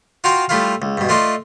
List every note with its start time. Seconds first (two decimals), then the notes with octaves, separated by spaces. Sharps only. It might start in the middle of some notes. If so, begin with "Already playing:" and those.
0.24 F4 F#4 F5 G5 A#5 C6
0.49 G3 A3 E4 F4 F5
0.82 C#2
0.97 G2 B2
1.09 A3 F4 D5 D#5 C6